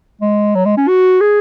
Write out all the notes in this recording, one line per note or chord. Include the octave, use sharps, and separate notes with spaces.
G#3
F#3
G#3
C#4
F#4
G#4